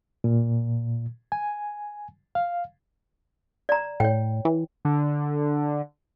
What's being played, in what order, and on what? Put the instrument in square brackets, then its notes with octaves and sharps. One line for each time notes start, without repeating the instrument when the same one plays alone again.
[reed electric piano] A#2
G#5
F5
[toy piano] D5 A#5
[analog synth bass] A2 [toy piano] C#5 G5
[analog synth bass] E3
[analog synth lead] D3